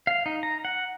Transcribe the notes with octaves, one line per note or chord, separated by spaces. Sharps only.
F5
D#4
A#5
F#5